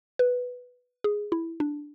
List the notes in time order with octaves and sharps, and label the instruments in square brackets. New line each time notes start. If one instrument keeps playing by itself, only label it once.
[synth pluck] B4
G#4
E4
D4